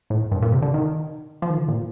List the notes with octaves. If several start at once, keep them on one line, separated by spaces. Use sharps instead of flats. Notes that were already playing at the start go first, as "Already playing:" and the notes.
A2
G2
A2
A#2
C3
D3
D#3
F3
D#3
D3
A#2